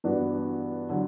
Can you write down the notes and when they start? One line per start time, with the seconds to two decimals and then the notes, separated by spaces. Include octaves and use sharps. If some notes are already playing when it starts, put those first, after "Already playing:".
0.04 G2 E3 B3 D4 F#4
0.89 D3 F#3